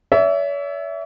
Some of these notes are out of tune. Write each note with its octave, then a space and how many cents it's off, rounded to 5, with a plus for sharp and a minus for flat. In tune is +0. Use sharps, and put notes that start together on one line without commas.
C#5 +45 E5 +0